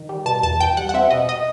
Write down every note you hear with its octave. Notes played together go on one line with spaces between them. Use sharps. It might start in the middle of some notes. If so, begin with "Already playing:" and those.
Already playing: D#3
G3
B2 A5
E2 A5
E2 G5
G3 F#5
F#5
C4 E5
B2 D#5
D#5